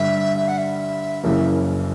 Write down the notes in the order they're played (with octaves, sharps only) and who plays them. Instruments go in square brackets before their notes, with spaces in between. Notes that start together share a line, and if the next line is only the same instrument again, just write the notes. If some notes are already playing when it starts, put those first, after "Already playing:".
Already playing: [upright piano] G2 D3 G3 [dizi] E5
[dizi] E5
F#5
E5
[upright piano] F#1 F#2 C#3 E3 A#3 [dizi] E5